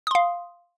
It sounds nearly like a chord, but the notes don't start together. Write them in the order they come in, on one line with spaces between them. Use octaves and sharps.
D#6 C6 F5